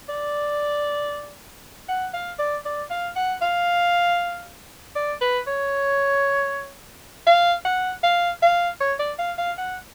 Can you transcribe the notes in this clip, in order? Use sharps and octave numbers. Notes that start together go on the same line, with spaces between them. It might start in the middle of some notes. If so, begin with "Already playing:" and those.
D5
F#5
F5
D5
D5
F5
F#5
F5
D5
B4
C#5
F5
F#5
F5
F5
C#5
D5
F5
F5
F#5